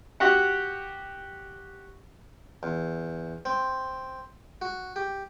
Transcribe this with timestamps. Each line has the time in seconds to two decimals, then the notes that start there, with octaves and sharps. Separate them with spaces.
0.20 F#4 G4 F#5
2.63 E2
3.45 C4
4.62 F#4
4.96 G4